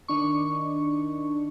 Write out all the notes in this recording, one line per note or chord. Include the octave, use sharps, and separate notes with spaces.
D#3 D4 C#6